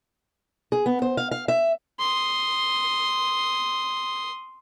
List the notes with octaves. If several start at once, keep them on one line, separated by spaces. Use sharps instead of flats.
G#4
B3
C5
F5
F5
E5
C6 D#6